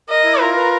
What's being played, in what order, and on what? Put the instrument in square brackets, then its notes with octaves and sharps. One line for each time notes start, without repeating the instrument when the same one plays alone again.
[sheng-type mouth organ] A#4 [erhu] D#5
[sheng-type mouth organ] E4
[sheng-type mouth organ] F4 [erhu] A#4
[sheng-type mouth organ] B4